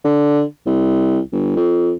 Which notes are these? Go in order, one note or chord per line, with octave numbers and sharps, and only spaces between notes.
D3
C2
G1
F2